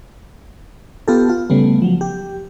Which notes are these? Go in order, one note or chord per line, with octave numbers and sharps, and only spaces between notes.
B3 F4 G4 A4
F4
C#3 G3 A3 B3
F3 F#3
G4